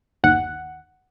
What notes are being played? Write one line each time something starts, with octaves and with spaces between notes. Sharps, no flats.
G1 D#2 F#5